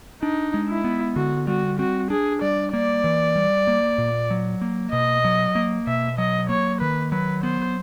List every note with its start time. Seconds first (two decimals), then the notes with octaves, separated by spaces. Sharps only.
0.22 D4 D#4
0.54 G#3
0.69 E4
0.84 B3
1.16 D3 F#4
1.47 G3 F#4
1.79 C4 F#4
2.10 D4 G#4
2.42 G3 D5
2.73 A#3 D5
3.04 E3
3.36 G3
3.67 A#3
3.98 A#2
4.30 F#3
4.61 A#3
4.92 B2 D#5
5.25 F#3
5.55 A#3
5.87 B2 E5
6.18 F#3 D#5
6.49 A#3 C#5
6.81 D#3 B4
7.12 F#3 B4
7.43 B3 C5